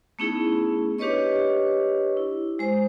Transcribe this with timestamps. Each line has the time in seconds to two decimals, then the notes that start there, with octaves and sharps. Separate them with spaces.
0.19 A3 B3 C#4 D#4 E4 G#4
0.98 D4 G4 B4 C#5 D#5 C#6
2.17 E4
2.59 G#3 C5